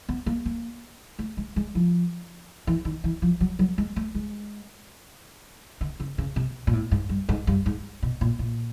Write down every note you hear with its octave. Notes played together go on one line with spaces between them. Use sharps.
B3
A#3
A#3
A3
G#3
G#3
F3
E3
D#3
E3
F3
F#3
F#3
G#3
A3
G#3
D3
C#3
C#3
C3
A#2
A2
G#2
G2
G#2
G2
G#2
B2
A#2
A#2